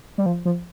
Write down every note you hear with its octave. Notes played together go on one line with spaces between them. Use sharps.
G3
F3
F3